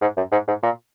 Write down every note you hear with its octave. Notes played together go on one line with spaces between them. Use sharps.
G#2
F#2
G#2
G#2
A#2